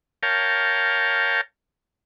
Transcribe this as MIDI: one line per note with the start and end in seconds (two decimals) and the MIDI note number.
0.23 1.41 70
0.23 1.41 73
0.23 1.41 77
0.23 1.41 79
0.23 1.41 81